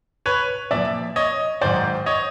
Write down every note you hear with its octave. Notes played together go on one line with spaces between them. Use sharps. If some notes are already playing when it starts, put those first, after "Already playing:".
B4 C#5
A#2 F3 D5 E5
C#5 D#5
G#2 D#3 F#3 C5 D5
C#5 D#5